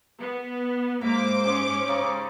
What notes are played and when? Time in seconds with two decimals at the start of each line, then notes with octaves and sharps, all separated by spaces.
0.20 B3
1.01 G#2 G#3 A#3 C5 E5 B5 D6
1.44 G#3 C#4 G4 C6
1.88 C#3 D#4 D5